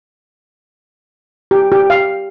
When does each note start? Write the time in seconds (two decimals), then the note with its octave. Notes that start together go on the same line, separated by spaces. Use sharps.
1.51 G4
1.72 G4
1.90 F5